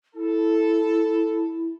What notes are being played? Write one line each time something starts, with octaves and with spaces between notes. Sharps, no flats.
E4 A4